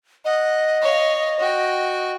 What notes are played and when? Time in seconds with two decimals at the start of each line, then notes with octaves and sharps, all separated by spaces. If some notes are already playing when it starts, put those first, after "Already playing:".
0.25 D#5 F#5
0.82 C#5 F5
1.39 F#4 G5